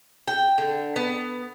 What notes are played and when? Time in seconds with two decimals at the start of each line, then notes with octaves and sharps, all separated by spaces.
0.28 G5
0.58 D3
0.96 B3